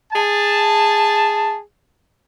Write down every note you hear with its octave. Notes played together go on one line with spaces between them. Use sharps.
G#4 A5